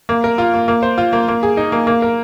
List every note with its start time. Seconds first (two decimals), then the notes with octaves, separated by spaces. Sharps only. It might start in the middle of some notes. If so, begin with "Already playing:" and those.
0.09 A#3
0.24 A#4
0.38 F4
0.54 A#3
0.68 A#3
0.83 C5
0.98 F4
1.13 A#3
1.28 A#3
1.43 G#4
1.57 D#4
1.72 A#3
1.87 A#3
2.02 A#4